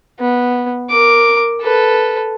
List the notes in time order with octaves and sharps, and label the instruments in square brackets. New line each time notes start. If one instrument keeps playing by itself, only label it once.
[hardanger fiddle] B3
A#4 D6
A4 B4